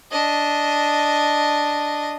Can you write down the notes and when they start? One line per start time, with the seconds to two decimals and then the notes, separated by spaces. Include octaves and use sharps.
0.11 D4 D#5